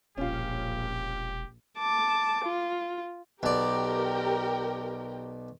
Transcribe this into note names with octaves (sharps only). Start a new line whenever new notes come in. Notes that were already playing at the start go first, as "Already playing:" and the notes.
E1 A#1 C#4 F4 G4
A5 D6
F4
B1 G4 A#4 D5 G5